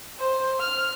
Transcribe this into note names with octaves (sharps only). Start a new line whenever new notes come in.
C5
F6